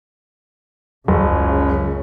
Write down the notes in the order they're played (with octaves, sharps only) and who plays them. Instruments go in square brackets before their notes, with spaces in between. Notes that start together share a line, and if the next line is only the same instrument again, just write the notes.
[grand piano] F#1 [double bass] C#2 C#3